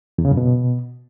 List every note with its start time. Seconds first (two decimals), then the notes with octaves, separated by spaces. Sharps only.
0.18 E2
0.25 C#3
0.31 F#2
0.37 B2